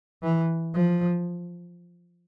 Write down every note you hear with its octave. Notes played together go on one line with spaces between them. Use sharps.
E3
F3